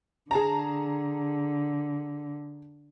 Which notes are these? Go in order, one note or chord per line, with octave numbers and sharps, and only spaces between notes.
D3 G#4 A5 A#5